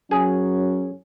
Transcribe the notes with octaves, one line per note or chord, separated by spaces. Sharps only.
F#2 F#3 C#4 G#4